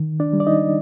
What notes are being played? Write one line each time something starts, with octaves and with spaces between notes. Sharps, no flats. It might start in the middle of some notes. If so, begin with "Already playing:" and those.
Already playing: D#3
D4 D5
G3
D5
D#4 D#5